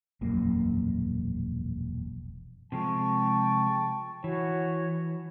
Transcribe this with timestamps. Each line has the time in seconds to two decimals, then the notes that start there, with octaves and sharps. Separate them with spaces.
0.21 E1 A#1 F#2 A#3
2.72 C3 F3 G#3 G5 A5 C#6
4.24 E3 F#4 C#5